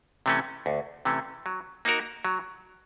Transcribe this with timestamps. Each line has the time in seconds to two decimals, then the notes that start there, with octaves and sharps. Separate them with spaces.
0.26 C3 E3 A3 C#4
0.66 D2
1.05 C3 E3 A3 C#4
1.46 F#3
1.85 A#3 D#4 F#4 A#4
2.25 F#3